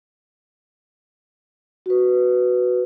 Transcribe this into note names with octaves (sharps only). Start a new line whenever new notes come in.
F#4 B4